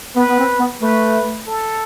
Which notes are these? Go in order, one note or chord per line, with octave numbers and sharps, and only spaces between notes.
B3 B4
B3
C4
B3
A3 B4
A4